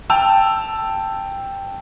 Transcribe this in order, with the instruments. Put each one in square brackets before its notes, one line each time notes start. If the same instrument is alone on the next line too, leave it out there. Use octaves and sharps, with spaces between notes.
[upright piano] G5 A5 E6 F7